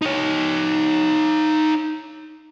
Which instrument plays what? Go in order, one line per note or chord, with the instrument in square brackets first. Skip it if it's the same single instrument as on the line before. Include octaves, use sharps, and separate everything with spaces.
[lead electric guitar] D#4 C#5